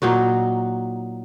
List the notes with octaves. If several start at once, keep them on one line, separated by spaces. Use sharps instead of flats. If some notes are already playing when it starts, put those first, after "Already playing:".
A#2 F#3 D#4 F#4